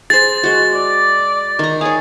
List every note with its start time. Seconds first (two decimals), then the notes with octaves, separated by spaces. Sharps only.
0.10 G#4 C5 A6
0.43 G#3 F#4
0.74 D5
1.59 D#3 A#5
1.81 G#4 C#5 F5